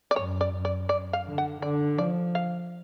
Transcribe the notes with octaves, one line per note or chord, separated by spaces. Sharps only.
D5
F#2 C#5
D5
F#2
D5
D5
F5
D3
F#5
D3 D5
F3 D5
F5